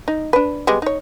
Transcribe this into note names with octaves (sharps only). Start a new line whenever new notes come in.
D#4
D4 B4
G3 G#3 B3
D#4 C#5